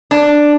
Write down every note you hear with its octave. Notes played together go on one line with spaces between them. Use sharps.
D4